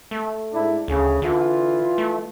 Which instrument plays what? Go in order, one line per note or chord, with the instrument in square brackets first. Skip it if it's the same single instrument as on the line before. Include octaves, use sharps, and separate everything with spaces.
[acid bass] A3
[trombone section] G#2 D4 E4
[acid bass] D2 [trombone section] C#3
[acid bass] D3 [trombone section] E3 F4
[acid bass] A3